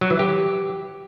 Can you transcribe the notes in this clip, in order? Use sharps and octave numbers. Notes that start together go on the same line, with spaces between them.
F#3
E3
G4